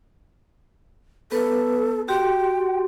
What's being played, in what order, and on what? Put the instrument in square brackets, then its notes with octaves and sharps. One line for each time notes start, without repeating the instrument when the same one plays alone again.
[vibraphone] B3 B4 [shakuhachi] A4
[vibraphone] F#4 G4 C6 [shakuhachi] G5